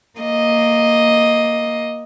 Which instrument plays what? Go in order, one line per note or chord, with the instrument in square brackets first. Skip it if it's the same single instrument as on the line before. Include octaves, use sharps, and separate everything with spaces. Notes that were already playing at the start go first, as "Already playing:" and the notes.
[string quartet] A#3 D#5